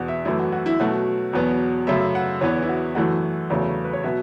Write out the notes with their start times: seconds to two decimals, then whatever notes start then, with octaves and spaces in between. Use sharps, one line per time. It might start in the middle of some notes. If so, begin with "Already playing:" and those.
Already playing: E2 B2 B3 F#5
0.08 E5
0.25 F#2 E3 A3 E4
0.39 F#4
0.52 F#4
0.66 E4
0.80 B2 F#3 A3 F#4
1.33 E2 B2 F#3 B3
1.87 F#2 C#3 A3 E5
2.15 F#5
2.41 E2 E3 B3 C#5
2.62 E4
2.69 F#4
2.95 F#2 E3 A3 F#4
3.50 E2 C#3 F#3 A3
3.84 B4
3.93 C#5
4.03 B2 F#3 B3 E5